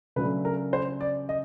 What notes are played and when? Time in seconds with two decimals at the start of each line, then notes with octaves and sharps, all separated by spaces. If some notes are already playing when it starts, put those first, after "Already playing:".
0.16 C#3 F#3 A3 D4 B4
0.45 A#4
0.73 C5
1.01 D5
1.29 D#5